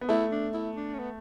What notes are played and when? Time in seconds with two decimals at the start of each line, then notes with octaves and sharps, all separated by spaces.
0.01 B3
0.09 A3 E4
0.32 D4
0.54 E4
0.76 D4
0.94 C#4
0.99 B3